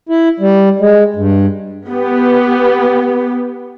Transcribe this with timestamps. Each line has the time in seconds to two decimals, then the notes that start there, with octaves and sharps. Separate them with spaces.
0.09 E4
0.40 G3
0.80 G#3
1.16 G2
1.88 B3 G4